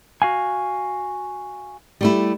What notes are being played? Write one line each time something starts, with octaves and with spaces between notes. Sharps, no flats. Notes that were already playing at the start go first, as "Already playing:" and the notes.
F#4 F5 G#5
G3 A3 E4